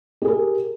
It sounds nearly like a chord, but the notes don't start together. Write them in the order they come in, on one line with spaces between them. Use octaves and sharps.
G4 G#4 A#4